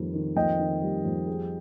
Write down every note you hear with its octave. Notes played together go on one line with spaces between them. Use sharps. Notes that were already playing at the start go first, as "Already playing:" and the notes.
Already playing: F2 D#3 G3
D#3
F2 D#5 G5
D#3
G3
F2
G#4